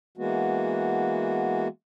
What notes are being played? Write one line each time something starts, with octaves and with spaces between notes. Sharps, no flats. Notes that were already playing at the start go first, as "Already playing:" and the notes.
E3 G#3 A#3 B3 F#4